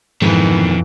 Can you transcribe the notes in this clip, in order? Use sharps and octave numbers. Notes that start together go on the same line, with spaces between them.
F2 G#2 B2 D#3 E3